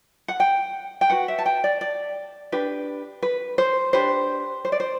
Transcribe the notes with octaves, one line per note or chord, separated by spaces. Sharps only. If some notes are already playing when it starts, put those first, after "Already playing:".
F#5
G5
G5
F#4 B4 F#5
E5
A5
G5
D5
D5
D4 G4 B4
B4
C5
D4 G4 B4 C5
C5
D5
C5